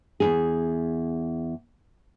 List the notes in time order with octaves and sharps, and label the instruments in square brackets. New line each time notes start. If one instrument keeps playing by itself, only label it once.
[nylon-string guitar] E2 G2 G#4